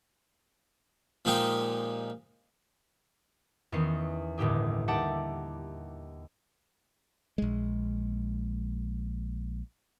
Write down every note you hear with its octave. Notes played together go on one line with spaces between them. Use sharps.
A#2 F3 G#3 D#4 G4 G#4
E2 D#3 E3 C#4 C7
G1 D#2 A2 E4 G4 G#4
D#2 G4 E5 F#5 A5 D6
A#1 G#3